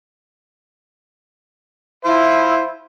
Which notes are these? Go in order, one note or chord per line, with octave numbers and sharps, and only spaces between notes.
E4 C5 F5